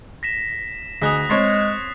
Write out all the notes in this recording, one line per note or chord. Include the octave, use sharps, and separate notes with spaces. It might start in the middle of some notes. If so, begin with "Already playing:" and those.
A#6 B6 E7
D2 G#4 D#5 D#6 F#6 B6
G#3 C4 C#5 C6 A6 C7